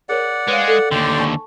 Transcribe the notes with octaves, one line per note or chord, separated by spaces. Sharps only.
G#4 A#4 C#5 D5 F#5
G#3 B4 C#5 F5
A4
D#2 D3 D5 G5 C6
G#5 A5 C#6